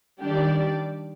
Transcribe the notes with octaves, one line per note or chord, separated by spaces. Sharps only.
D#3 G3 D4 G4 D5